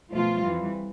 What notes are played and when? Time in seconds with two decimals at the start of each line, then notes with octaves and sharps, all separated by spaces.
0.11 B2 F3 A3 F4
0.43 F2 E3 G3